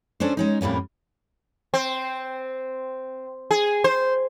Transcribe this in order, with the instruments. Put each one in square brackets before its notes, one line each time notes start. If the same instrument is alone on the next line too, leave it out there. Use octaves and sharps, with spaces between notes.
[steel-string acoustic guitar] C#4 D4 A4 C5
G#3 C#4 D#4
F2 A2 G3 A#3 C#4
[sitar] C4
G#4
C5